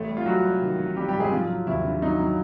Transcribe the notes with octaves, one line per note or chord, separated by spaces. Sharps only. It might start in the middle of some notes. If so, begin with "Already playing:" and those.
Already playing: A1 A3
G3
F4
F#3 G3 F#4
G3
D#3
A1
A1 G3 G4
G3 G4
G#2
G#3 G#4
F3 F#3 F4
F#3
D#2 E4
D3
F#3 D#4
F#3